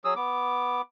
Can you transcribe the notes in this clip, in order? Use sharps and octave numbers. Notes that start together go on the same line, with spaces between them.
F#3 G#4 D#6 E6
B3 D6